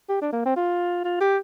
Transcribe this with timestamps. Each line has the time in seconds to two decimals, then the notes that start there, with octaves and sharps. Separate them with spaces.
0.09 G4
0.21 D4
0.33 A#3
0.46 C4
0.56 F4
1.04 F4
1.21 G4